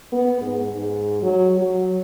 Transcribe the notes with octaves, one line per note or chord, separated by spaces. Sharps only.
B3
G#2
G#2
F#3
F#3